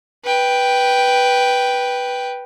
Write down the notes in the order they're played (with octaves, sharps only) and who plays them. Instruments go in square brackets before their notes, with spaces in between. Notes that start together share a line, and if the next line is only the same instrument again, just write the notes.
[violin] B4 G5